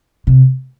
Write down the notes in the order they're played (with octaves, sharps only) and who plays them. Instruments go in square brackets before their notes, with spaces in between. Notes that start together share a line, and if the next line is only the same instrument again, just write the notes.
[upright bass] C3